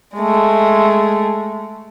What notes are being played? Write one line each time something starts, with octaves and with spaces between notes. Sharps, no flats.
G#3 A3